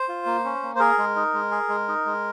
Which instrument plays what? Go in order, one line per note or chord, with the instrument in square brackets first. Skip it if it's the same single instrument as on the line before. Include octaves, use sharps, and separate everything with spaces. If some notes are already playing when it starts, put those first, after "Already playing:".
Already playing: [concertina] C5
F4
A#3
C#4
A#3
C5
G#4 A#4
G#3
D#4
G#3
G#4
G#3
D#4
G#3